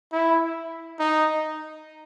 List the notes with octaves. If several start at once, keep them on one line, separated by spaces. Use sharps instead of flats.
E4
D#4